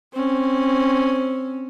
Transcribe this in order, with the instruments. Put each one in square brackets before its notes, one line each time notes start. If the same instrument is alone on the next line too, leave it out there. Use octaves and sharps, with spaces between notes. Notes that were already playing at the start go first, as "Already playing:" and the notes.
[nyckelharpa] C4 C#4